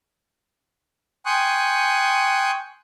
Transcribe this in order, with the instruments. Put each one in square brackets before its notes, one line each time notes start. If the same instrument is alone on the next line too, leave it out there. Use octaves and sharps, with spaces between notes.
[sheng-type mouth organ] G5 G#5 C6 C#6 D#6 F#6